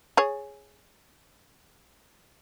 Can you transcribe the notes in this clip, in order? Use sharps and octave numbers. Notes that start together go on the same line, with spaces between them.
G#4 C#5